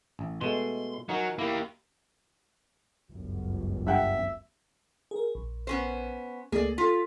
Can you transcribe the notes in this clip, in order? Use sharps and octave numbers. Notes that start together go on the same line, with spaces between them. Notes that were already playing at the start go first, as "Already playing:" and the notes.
A1
B2 G#3 A3 C6
F#3 D#4 A#4 G#5
A#3 E4 G4
G1 C#2 F#2
G2 E5 F#5 G5
G#4 A#4
A#1
B3 C#4 C5
C#2 A3 A#3 G#4 D5
F4 A4 B6